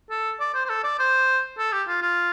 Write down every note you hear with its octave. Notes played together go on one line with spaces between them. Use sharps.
A4
D5
C5
C5
A4
D5
C5
A4
G4
F4
F4